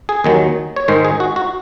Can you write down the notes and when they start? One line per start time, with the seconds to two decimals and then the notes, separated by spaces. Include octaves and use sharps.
0.09 G#4
0.24 D#2 D#3 F#3
0.76 C#5
0.88 G#2 D#3 G#3 C5
1.05 G#4
1.20 F#4
1.36 F#4